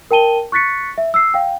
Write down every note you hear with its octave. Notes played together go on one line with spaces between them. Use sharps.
A#4 G5 A5 D#7 G7
C#6 F#6 A6 B6 C#7
E5
E6 C7
F5 G5